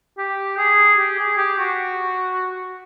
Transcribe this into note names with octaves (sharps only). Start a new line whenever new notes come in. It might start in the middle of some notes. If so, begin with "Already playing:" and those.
G4
G#4
G4
G#4
G4
F#4